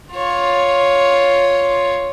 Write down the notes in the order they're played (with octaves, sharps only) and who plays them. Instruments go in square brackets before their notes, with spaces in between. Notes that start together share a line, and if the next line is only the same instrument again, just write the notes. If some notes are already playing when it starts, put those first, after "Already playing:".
[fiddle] F4 C#5